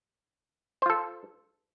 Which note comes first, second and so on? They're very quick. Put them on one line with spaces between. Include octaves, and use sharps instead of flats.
C5 F4 A4